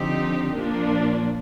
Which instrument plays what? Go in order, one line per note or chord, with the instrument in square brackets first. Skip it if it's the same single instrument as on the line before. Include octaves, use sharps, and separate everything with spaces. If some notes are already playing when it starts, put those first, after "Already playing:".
Already playing: [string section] D3 F3 C4 D#4 G4
A#2 F3 A#3 D4